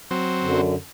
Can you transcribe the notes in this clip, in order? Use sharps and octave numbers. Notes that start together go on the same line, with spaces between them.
F#3 C4
F#2 D3